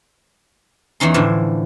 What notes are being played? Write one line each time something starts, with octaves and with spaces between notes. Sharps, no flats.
E2 E3 C#4 D#4 C6
A2 D3 E3 F3